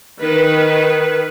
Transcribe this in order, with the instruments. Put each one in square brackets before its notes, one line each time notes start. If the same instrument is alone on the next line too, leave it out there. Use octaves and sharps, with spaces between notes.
[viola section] D#3 B4